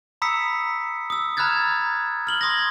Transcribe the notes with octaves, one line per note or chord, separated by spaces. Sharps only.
A#5 B5 D#6 E6 B6 C#7
D#6 E6
A#5 B5 F6 F#6 G#6 A6
F6 F#7 G7
C6 D#6 G#6 A#6